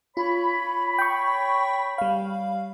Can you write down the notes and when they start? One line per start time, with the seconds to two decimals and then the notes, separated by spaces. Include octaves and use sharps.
0.17 F4 C#5 B5
0.99 G5 C#6
1.98 G3 F5